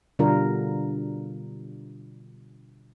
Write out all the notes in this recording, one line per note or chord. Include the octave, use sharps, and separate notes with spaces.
B2 D3 G3 D4 F4 A#4